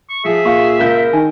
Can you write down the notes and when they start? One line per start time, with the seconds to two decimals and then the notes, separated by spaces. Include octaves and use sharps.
0.10 C#6
0.25 F3 G#4 E5
0.45 A#2 F5 C#6
0.79 C#2 A#4 F5 G6
1.13 D#3 G#5